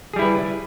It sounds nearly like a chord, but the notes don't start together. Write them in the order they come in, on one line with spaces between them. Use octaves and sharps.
G#4 G3 E4 B4